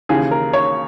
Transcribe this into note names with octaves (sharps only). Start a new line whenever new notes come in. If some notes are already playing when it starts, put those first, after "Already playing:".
D#2 C#3 E3 G#4
A#4
C#5